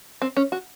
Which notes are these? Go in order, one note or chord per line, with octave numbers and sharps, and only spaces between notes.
C4
C#4
F#4